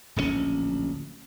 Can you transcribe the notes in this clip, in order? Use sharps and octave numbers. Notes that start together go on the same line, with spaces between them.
D1 A#1 G#2 C#4